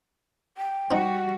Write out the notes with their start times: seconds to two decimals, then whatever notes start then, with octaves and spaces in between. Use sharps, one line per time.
0.57 G5
0.91 G3 C4 D#4 F#4 F#5